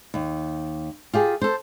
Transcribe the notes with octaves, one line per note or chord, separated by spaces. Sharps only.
D#2
F4 G4 G#4
A4 C5